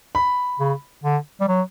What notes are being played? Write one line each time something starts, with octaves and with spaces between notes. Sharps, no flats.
B5
C#3
D3
G3
F#3